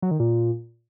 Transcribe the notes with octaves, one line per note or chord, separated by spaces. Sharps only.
F#3
D#3
A#2